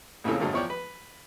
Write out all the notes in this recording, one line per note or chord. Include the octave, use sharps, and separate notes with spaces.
A#1 F2 A2 C#3 A4
D2 G2 A#2 D3 F#3 G#3
E2 F3 C#5 D5 G5
B4